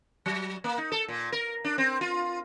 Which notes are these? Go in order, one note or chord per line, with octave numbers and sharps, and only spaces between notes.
F#3
A#3
D#4
A4
A#2
A#4
D4
C4
F4